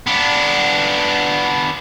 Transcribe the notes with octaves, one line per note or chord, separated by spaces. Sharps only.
B3 D4